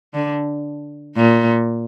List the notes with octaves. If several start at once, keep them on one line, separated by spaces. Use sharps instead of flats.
D3
A#2